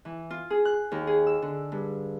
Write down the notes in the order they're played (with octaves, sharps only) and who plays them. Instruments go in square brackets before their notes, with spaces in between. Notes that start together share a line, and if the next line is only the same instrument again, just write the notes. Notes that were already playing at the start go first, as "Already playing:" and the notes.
[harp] E3
F4
G#4
F#6
D#2
G#4
E6
D3
G2